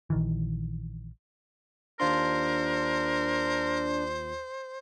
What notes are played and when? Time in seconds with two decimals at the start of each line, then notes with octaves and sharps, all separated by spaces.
0.10 A#1 D#3 E3
2.00 D#2 D4 F4 A#4 C5 C6